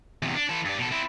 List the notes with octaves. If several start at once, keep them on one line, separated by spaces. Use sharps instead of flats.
E2 C3
D4
E3 A4
G2 D4
B2 A4
C4 E4